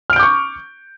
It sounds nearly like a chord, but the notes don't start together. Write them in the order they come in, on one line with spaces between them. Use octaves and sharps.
F6 D7 G6 D6 C#6